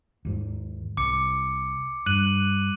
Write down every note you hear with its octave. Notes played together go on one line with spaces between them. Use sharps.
D#2 G#2
C2 D6 C#7
G2 F#6 D#7 F#7